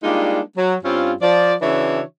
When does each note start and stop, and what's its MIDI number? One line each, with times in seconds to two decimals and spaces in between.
0.03 0.40 55
0.03 0.40 56
0.03 0.40 58
0.03 0.40 62
0.03 0.40 63
0.03 0.40 65
0.56 0.75 54
0.83 1.13 43
0.83 1.13 55
0.83 1.13 60
0.83 1.13 61
0.83 1.13 65
1.21 1.54 53
1.21 1.54 74
1.61 2.01 49
1.61 2.01 52
1.61 2.01 62
1.61 2.01 66
1.61 2.01 73
1.61 2.01 76